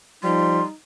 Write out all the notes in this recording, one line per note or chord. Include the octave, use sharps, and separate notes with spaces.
F3 G3 D#4 C6